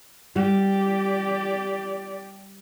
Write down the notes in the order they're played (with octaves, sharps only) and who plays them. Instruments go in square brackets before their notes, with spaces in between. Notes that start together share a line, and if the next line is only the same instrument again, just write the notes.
[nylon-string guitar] G3 [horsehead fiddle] G4 D5